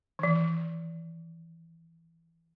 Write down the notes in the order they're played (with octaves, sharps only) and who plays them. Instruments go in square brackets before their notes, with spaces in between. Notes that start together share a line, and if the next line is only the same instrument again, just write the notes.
[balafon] D#3 E3